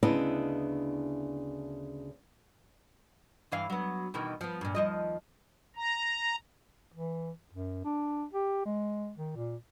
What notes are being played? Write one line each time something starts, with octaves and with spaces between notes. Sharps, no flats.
D2 C#3 B3 D4 E4 D#5
G2 E3 F5
F#3 B3
B2 D#3 E3
F3 B3
G2 A#2
D#2 F3 D#5
A#5
E3
F#2
D4
G4
G#3
D#3
A#2